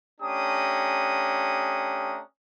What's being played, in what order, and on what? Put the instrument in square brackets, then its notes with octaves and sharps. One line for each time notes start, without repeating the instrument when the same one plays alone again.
[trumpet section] A3 C#4 D4 G4 A#5 D#6